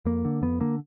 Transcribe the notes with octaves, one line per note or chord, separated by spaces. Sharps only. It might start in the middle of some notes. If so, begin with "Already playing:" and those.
F2 A#3
D3
F2 B3
D3 A#3